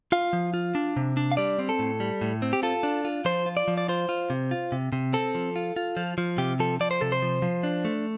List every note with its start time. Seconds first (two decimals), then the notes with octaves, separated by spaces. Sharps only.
0.12 F4 F5
0.33 F3
0.54 F4
0.75 D4
0.97 C3
1.17 D4
1.32 F5
1.37 G3 D5
1.59 C4
1.69 A4
1.79 A2
2.00 G3
2.21 A2
2.42 C4
2.53 G4
2.63 F4 A4
2.83 D4
3.05 F4
3.25 F3 C5
3.46 F4
3.57 D5
3.68 F3
3.78 D5
3.88 F4 C5
4.09 F4
4.30 C3
4.51 F4
4.72 C3
4.93 C3
5.13 C4 A4
5.35 F3
5.56 F4
5.76 F4
5.97 F3
6.18 F3
6.38 C3 G4
6.60 F3 A4
6.80 F3 D5
6.91 C5
7.01 C3 A4
7.12 C5
7.22 F3
7.42 F3
7.63 D4
7.85 A3